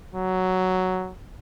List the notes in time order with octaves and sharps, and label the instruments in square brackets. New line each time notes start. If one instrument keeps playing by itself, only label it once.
[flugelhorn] F#3